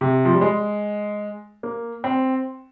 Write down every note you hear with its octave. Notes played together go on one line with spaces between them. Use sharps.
C3
F3
G3
G#3
A#3
C4